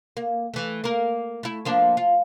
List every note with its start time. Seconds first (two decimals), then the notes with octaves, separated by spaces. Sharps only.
0.17 A#3
0.54 E3 A3
0.84 A#3 A#4
1.43 A3 E4
1.65 F3 A#3 D4
1.97 F4